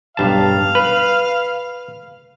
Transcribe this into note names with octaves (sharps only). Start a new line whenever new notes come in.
B1 G2 F5 A5
B4